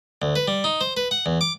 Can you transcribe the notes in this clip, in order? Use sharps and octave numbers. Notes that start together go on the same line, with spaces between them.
D2
B4
G3
D#4
C5
B4
F#5
E2
D6